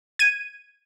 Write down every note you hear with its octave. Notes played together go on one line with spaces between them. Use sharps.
G#6 D#7